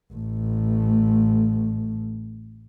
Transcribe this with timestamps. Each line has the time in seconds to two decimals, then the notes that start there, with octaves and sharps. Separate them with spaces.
0.13 A1 A3